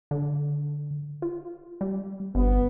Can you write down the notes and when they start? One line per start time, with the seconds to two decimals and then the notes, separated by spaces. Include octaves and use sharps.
0.11 D3
1.22 F4
1.81 G3
2.35 G1 B3